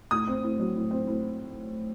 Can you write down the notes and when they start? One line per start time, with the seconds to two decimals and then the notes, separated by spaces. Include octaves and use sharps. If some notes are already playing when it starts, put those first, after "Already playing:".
0.11 A2 D#6
0.27 C4
0.43 A2
0.59 F#3
0.76 A2
0.91 C4
1.07 A2